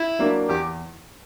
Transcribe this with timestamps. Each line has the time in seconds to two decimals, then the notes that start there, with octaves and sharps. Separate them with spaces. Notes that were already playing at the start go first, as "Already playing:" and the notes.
Already playing: E4
0.19 F#3 A#3 D4
0.49 E2 G4